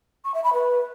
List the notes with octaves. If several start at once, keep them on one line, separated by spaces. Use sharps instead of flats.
C#6
E5
B5
B4